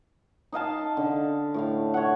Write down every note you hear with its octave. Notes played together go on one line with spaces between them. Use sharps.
D#4 D#5 F5 A5
D3
A2 A3 F5
C#5 F#5